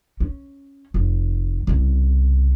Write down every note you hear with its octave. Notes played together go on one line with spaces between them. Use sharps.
C#4
F1
C2 C#3